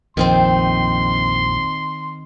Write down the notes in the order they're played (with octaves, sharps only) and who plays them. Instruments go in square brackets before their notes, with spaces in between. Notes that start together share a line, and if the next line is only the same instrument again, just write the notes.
[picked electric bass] A#1 F2 [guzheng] D#3 C4 C5 [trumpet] C6